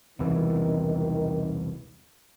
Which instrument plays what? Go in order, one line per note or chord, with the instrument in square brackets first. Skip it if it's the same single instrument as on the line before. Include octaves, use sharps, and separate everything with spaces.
[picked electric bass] E1 C2 E3 [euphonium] D#3